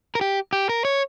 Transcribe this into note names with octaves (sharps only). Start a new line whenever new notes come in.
A#4
G4
G4
A#4
C#5